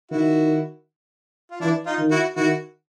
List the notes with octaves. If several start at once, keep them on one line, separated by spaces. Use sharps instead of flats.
D#3 E4 F#4
F4
E3 D4 E4
D#4 F4
D#3
E4 F#4
D#3 E4 F#4